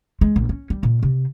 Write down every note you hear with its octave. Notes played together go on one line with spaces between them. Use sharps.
G#3
A#1
C#4
G3
A#2
C3